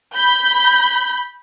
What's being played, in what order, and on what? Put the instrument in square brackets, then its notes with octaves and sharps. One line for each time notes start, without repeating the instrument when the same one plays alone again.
[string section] B5 G6